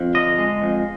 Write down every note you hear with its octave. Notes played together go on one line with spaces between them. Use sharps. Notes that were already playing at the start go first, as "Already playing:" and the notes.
Already playing: F2
D3 D#5
G#3
F2